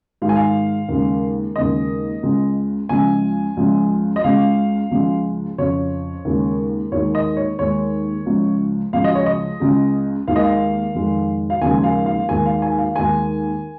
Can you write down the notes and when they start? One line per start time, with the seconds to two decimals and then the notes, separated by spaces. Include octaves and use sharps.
0.22 G#2 D#3 G#3 F5
0.29 G#5
0.36 F5
0.89 D#2 C#3 G#3
1.56 D#2 C#3 G#3 D#5
2.23 C#2 C#3 G#3
2.89 C#2 C#3 F3 G#5
3.57 C#2 C#3 F3 G#3
4.16 D#5
4.24 C#2 C#3 G#3 F5
4.91 C#2 C#3 F3 G#3
5.58 F2 C#3 F3 C#5
6.25 D#2 C#3 G#3
6.92 D#2 D#3 G#3 C#5
7.15 D#5
7.37 C#5
7.59 D#2 D#3 G#3 C#5
8.26 C#2 C#3 F3
8.93 C#2 C#3 F3 G#3 F5
9.04 D#5
9.15 C#5
9.26 D#5
9.60 C#2 C#3 G#3
10.28 D#2 D#3 G#3 F5
10.36 D#5
10.43 F5
10.95 F2 D#3 G#3
11.50 F5
11.61 D#2 C#3 F3 G#3 G#5
11.78 G#5
11.84 F5
12.06 F5
12.29 D#2 D#3 G#3 G#5
12.46 F5
12.62 G#5
12.78 F5
12.96 D#2 D#3 G#3 G#5